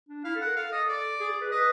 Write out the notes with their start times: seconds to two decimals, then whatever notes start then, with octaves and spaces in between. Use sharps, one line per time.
0.09 D4
0.24 E4 F5
0.35 A4
0.41 A#4 F#5
0.56 A4 F5
0.72 A4 D#5
0.89 D5
1.20 G#4
1.30 G#4
1.41 B4
1.51 B4 D#5